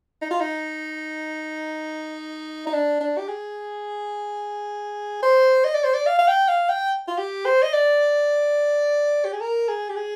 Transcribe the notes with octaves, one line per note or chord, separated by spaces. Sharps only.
D#4
F4
D#4
D#4
D4
D4
G4
G#4
C5
D#5
D5
C5
D5
F5
F5
G5
F5
G5
F4
G4
C5
D#5
D5
G4
G#4
A#4
G#4
G4
G#4